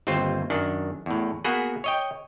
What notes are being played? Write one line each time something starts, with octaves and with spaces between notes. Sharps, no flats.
G1 D#2 C4 F4 C5
F#2 D#3 D4
E2 A2
A#3 B3 F#4 G#4 B4
C#5 D#5 G5